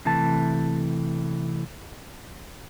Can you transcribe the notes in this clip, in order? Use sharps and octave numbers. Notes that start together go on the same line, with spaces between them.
C3 E3 A3 A5